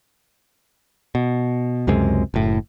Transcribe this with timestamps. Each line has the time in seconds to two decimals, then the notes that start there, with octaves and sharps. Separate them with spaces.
1.15 B2
1.87 C#2 F#2 C3 G#3
2.34 F#1 A2